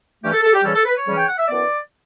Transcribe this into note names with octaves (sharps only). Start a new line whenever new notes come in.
G2 E3 A3 C#4 G4
A4
A4
G4
C#3 E3 G3 C#4 A4
A4
B4
C#5
C#3 E3 G3 C#4
G5
F#5
E5
F#2 E3 B3 D5